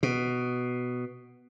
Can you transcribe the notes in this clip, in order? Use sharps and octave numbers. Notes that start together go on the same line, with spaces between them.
B2